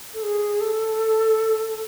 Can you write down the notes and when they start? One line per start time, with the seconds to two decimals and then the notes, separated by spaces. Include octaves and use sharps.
0.14 A4
0.23 G#4
0.61 A4